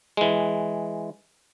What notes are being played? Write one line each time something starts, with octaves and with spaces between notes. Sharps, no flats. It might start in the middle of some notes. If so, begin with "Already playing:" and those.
E3 G#3